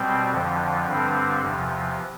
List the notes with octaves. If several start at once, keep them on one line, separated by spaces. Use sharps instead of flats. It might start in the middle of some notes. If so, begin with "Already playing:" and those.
Already playing: B2 G3 C4
F2 D3 F3
G2 D3 G3 C4
E2 C3 F3